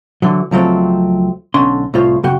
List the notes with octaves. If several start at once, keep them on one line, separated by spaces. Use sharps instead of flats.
D3 E3 F#3
C#2 F3 F#3 A3 C4
B1 D3 C#4 C6
C2 A2 F4 C5 C#5
F#2 C#3 F#4 G5